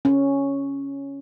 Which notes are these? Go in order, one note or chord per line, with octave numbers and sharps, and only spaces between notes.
C#4